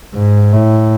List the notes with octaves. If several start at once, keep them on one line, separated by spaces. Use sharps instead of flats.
G#2
A2